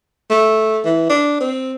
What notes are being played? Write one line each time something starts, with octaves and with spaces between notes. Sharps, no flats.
A3
E3
D4
C4